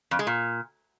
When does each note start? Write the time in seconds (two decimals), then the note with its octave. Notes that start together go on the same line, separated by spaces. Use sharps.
0.11 F2
0.19 G#3
0.27 A#2